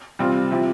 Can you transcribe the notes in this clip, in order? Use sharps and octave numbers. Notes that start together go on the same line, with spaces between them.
C3 G3 C4 F4
F3 C4 E4 G4